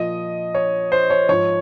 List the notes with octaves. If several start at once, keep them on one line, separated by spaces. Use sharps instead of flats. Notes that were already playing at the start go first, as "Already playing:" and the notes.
Already playing: A#2 F3 D#5
C#5
C5
C#5
G#2 F3 C#5